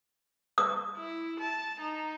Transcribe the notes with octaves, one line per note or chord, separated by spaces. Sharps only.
D#6
E4
A5
D#4